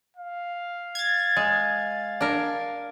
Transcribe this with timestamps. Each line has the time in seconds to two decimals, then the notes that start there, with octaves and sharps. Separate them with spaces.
0.16 F5
0.95 G#6 A6
1.36 G#3
2.21 D4 A#4